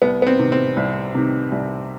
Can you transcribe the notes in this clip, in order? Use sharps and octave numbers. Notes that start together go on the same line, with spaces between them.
C2 B3
B3
C4
C3 D#3
C4
C2
C3 D#3
C2